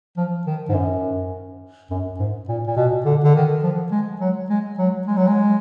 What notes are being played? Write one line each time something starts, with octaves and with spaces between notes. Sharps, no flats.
F3
D#3
G#2
F#2
F#2
G#2
A#2
A#2
B2
D3
D3
D#3
F3
G#3
F#3
G#3
F#3
G#3
F#3
G#3